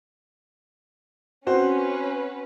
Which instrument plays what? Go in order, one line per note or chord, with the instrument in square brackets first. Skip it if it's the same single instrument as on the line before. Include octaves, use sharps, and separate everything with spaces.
[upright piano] C4 F#4 C5 [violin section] C#4 B4